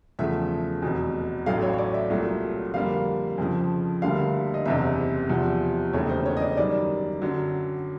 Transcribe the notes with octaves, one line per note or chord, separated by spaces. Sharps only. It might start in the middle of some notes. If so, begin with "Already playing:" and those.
E2 C#3 F3 A3 E5
F1 E2 B2
A1 A2 F#3 A3 F5
C#5
C#5
D5
E5
C2 A#2 F#3 A3
F2 D3 G3 A#3 F5
F2 C#3 F3
D2 D3 G3 A#3 F5
D#5
F#1 E2 C3 E5
E2 C3 F3
E1 D#2 C#3 E3 A3 C#5
C5
C#5
D#5
D5
F#2 D#3 G3 D5
F#2 D3 F#3